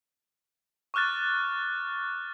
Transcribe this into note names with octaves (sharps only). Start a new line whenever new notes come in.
C#6 D6 F6 F#6 A6